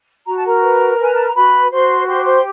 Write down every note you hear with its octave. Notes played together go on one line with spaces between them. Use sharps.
F#4 A#5
A5
A#4 A#5
B4
B4 G#5
A5
A#5
F#4 B4 B5
F#4 C5 C6
G4 C5 C6
C5 C6